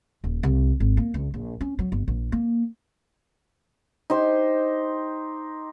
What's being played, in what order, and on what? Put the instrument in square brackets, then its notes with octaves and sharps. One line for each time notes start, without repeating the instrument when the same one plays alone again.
[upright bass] D#1
C2
G#1
A#3
C#2
A#1
C#4
F#3
G1
A#1
A#3
[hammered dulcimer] D#4 G4 C5